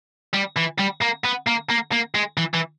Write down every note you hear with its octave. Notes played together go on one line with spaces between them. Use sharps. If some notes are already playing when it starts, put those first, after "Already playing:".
G3
E3
G3
A#3
B3
A#3
A#3
A#3
G#3
E3
E3